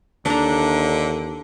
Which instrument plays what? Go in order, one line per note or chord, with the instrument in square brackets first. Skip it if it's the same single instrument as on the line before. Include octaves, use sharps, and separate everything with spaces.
[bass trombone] D#2 [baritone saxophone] D3 [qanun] D4 A#5